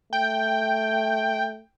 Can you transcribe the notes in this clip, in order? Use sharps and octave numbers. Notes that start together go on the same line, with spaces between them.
A3 G5